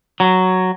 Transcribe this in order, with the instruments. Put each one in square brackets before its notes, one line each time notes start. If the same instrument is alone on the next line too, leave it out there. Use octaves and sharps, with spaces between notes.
[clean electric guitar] F#3